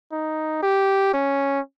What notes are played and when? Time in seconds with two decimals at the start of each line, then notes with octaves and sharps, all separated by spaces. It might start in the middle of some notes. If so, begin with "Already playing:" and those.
0.12 D#4
0.63 G4
1.14 C#4